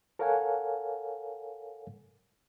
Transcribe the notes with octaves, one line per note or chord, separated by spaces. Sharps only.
A4 A#4 C#5 F5 F#5 G#5